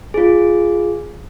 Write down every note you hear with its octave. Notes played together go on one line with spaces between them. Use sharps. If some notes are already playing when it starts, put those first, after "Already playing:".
F4 G#4